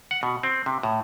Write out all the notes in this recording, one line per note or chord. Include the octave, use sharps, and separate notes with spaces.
F#5
B2
C4
C3
A2